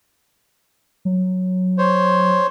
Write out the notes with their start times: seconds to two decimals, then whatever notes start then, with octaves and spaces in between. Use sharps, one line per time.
1.05 F#3
1.78 C5 C#5